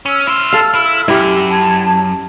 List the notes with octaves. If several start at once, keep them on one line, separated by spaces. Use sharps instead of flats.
C#4 E6 F6
E4 C5
A4 F5
E4
F#2 E4 G4
A5 G#6